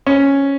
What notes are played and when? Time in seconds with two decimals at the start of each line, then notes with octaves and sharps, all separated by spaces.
0.07 C#4